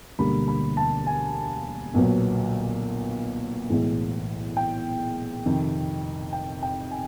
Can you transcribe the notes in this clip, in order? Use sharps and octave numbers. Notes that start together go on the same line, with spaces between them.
E1 D2 D3 G3 A#3 B5
B5
A5
G#5
B1 A#2 F#3 B3
B1 A2 E3 G#3
G5
F2 C3 D#3
G5
G5
G#5